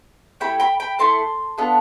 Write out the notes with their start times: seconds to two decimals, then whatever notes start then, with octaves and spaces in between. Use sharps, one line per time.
0.40 A3 E4 G4 G5 B5
0.60 G5 B5
0.80 G5 B5
0.99 A3 E4 A4 A5 C6
1.58 B3 D4 F4 A4